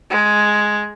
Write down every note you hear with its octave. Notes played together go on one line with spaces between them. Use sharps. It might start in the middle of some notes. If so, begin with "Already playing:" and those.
G#3